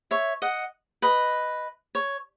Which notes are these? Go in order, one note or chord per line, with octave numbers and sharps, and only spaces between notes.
C#5 E5
D#5 F#5
B4 D#5
C#5